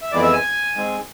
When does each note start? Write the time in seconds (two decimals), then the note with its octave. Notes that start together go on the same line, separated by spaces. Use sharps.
0.02 E5
0.12 F2 E3 G#3 B3 D5
0.22 E5
0.33 G#5
0.75 G#2 G#3 C4